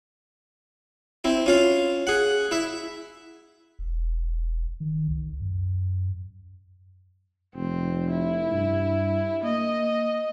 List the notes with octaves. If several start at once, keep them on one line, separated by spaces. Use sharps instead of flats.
C4 E4
C#4 F4 F5
G#4 F#5
E4 E5
E1
D#3
C2
F#2
F1 C4
E4
G2
A#3 D#5